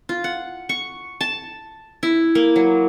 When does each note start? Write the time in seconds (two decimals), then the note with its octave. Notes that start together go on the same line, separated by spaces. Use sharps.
0.09 F4
0.24 F#5
0.69 C#6
1.21 A5
2.03 E4
2.35 A#3
2.56 F#3